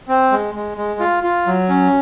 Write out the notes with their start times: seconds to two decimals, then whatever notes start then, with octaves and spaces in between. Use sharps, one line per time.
0.08 C4
0.32 G#3
0.55 G#3
0.78 G#3
1.00 F4
1.24 F4
1.47 F#3
1.69 C#4